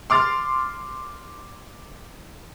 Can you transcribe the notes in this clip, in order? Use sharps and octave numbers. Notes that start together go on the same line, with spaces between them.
C6 D6 F6 A6